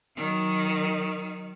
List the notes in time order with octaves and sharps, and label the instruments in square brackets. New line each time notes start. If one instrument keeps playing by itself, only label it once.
[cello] D#3 F#3